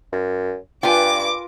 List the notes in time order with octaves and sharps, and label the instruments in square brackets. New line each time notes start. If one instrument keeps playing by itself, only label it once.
[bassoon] F#2
[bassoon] G2 [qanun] F4 A#4 B4 [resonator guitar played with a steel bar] G5 G#5 [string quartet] D6